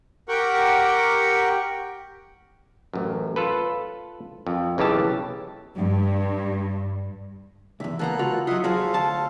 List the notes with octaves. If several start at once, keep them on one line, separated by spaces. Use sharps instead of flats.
G4 A#4 F#5 G5 C#6
A1 F#2
F4 A4 B4
F2
B1 C#3 E3 G4 A5
G2
B1 E2 E5
C#2 A#3 B3 A4 A#5 F#6
C#3 F4 F#4
F#3 F4 D#5 E5 F#5
F#3 F#4 G#4 A4 C5 F5
D2 A5